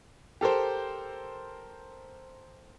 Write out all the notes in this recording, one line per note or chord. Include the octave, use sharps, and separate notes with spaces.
G4 A4 A#4 C5